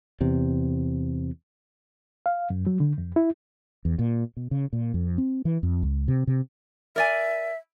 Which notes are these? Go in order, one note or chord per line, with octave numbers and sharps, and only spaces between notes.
E2 C3
F5
F#2
F#3
D3
F2
E4
E2
A#2
B2
C#3
A#2
F2
C4
E3
F2
C#2
C3
C3
A#4 D5 E5 G#5